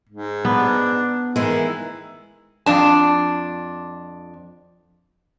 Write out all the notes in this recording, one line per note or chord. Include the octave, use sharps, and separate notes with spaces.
G#2
B3 D4
D#3 E3 G#3 E4
F2 D4 A5